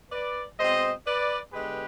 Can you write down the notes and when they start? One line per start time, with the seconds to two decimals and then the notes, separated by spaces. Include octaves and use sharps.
0.11 B4 D5
0.58 B2 G#3 C4 C5 D#5
1.05 B4 D5
1.52 D3 G#3 B3 G4 B4